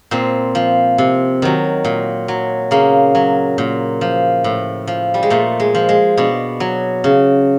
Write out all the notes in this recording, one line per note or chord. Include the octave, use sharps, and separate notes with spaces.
A#2 C4
F3
C3
D#3 F#3
A#2
F#3
C#3 A#3
F#3
A#2
F3
A2
F3
G3
G#3
A#2 A3
G#3
F3
G#3
B2 D4
F#3
C#3